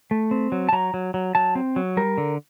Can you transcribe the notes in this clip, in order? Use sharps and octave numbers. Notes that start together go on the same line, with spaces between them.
A3
C4
F#3
A5
F#3 A#5
F#3
F#3
F#3 A5
C4
F#3
G3 A#4
D3